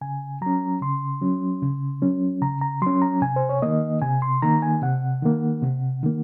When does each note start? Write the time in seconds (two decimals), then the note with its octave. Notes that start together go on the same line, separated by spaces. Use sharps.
0.01 C#3 G#5
0.41 F#3 C#4 A#5
0.82 C#3 C6
1.22 F#3 C#4
1.62 C#3
2.02 F#3 C#4
2.41 C#3 A#5
2.61 A#5
2.82 F#3 C#4 C6
3.02 A#5
3.22 C3 G#5
3.36 C5
3.49 C#5
3.62 D#3 A#3 D#5
4.02 C3 G#5
4.22 C6
4.42 D#3 A#3 A#5
4.62 G#5
4.82 C3 F#5
5.22 D#3 A#3
5.62 C3
6.03 D#3 A#3